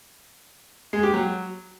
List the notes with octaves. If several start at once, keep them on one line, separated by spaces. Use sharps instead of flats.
G#3
G4
F#3